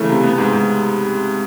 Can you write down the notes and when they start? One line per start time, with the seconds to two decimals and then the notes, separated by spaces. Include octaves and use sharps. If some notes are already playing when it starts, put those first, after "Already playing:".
Already playing: C#3 E3 A3
0.09 C3
0.23 B3
0.38 G#2
0.53 G#2